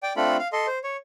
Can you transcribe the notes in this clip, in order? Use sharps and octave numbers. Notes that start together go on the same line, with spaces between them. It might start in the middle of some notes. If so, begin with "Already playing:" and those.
D5 G5
A3 C4 D4 F4 A4 B5
F5
A4 D#5 C6
C5
C#5